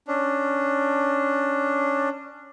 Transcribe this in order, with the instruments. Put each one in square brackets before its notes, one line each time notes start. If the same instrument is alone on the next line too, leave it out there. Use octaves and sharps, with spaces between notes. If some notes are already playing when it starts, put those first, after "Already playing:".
[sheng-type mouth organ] C#4 D4